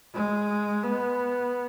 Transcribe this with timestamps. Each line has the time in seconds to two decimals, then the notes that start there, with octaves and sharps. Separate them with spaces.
0.14 G#3
0.83 B3